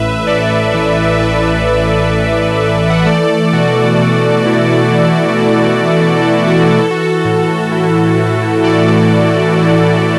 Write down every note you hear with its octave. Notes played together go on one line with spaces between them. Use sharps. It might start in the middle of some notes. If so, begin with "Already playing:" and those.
Already playing: A1 A2 B4 E5
A1 A4 D5
E3
A2 B4 E5
A1
A1
E3
F#5
E5
A3 A4 D5
B2 F#4
B2
E4
A3
B2
B2 F#4
A4
E4
F#4
E3 A4
F#4
A4
A2
E4
A3
E3 A4 D5
A2
E4 F#4
A3